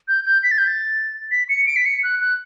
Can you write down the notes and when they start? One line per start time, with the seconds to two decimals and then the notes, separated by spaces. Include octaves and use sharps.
0.08 G6
0.26 G6
0.43 B6
0.51 A6
0.58 G6
0.67 A6
1.31 B6
1.49 C#7
1.67 D7
1.76 B6
1.86 C#7
2.03 F#6
2.21 F#6